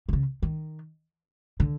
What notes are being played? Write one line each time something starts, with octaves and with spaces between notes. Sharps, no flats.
C3
C#3
D#3
D3